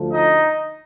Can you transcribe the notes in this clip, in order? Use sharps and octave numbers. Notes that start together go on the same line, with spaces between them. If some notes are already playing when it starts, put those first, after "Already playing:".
Already playing: D2 D3 F3
D#4 D#5